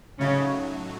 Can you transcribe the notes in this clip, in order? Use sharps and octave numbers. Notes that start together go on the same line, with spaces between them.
A2 C#3 F#3 A3 C#4 D#4 F#4